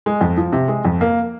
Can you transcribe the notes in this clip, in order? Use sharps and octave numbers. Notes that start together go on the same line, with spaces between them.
G#3
F2
F3
C3
G#3
F2
A#3